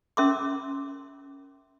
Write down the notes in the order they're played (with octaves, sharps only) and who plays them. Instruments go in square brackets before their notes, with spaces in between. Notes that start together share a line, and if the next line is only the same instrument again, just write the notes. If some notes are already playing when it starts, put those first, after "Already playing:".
[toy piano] C#4 A#4 E5 C6 D6